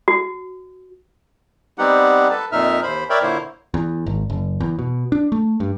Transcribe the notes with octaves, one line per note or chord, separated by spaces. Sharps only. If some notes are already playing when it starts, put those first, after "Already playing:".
F#4
G3 B3 C4 D#4 G4 F#5
A4 B4 A5
F2 A#2 D#4 E5 F6
D#2 C5 B5
A#4 C#5 D5 E5 G5 B5
A#2 D3 A#3 E4 C5 C#5
E2
G#1
F#1
E2
B2
D4
A3
G2